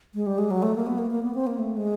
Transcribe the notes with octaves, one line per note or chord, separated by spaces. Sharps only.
G#3
G3
G#3
F#3
A3
A#3
B3
A#3
A#3
B3
C4
A#3
A3
G#3